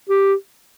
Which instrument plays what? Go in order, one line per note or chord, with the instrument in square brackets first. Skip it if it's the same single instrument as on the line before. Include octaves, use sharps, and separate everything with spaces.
[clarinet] G4